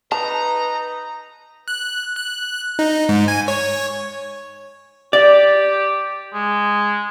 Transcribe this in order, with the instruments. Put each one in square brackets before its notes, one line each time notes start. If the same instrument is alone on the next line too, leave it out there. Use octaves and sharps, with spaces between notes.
[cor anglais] D#4 [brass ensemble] B4 [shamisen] A5 [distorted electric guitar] A#5
[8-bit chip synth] F#6
F#6
D#4
G#2
G#5
C#5
[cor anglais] G4 [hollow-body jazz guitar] D5
[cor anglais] G#3